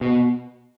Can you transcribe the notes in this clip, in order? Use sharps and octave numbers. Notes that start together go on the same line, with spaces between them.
B2